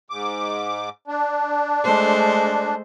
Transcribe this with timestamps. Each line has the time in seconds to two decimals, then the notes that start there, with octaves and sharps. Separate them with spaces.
0.10 G#2 D6
1.08 D4
1.84 G#3 A3 C5